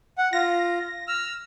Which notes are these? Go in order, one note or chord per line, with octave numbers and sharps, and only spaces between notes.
F#5
F4 A#6
E6 F6